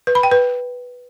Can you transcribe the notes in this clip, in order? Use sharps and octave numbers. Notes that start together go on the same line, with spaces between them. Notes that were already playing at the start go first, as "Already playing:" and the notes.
B4
B5
G5
B4